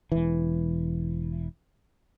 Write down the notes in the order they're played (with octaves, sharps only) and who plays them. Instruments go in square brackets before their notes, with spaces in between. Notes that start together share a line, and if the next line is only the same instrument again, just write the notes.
[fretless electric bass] E1 E3